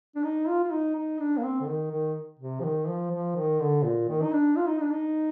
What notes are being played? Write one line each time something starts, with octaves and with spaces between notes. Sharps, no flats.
D4
D#4
F4
F4
D#4
D#4
D4
A#3
C4
D3
D#3
D#3
C3
F3
D#3
F3
F3
D#3
D3
A#2
D#3
D#4
D4
F4
D#4
D4
D#4